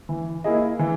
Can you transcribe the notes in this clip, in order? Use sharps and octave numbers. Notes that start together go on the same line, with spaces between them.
E3
A#3 E4 G#4 D#5
E3